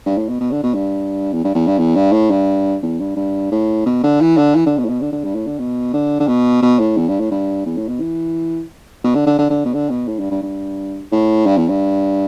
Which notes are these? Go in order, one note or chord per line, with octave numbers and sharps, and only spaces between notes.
G2
A2
B2
B2
D3
B2
G2
E2
G2
E2
G2
E2
G2
A2
G2
E2
G2
G2
A2
B2
D3
E3
D3
E3
D3
B2
A2
B2
D3
D3
G2
A2
D3
B2
D3
D3
B2
B2
A2
E2
G2
A2
G2
E2
A2
B2
E3
B2
D3
D3
D3
D3
B2
D3
B2
A2
G2
G2
G2
A2
G2
E2
G2